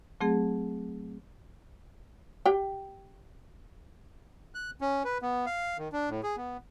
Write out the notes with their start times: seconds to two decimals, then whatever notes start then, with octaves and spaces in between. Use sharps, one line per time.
0.21 F#3 A3 C4 G#4
2.46 G4 G5
4.55 F#6
4.81 C#4
5.05 B4
5.22 B3
5.46 F5
5.78 D#3
5.93 D4
6.09 A2
6.23 G#4
6.37 B3